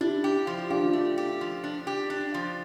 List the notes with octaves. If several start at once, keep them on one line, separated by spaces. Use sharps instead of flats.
D4 E4 G4
G4
F3
D4 F4 G4
A3
G4
F3
D4
G4
D4
F3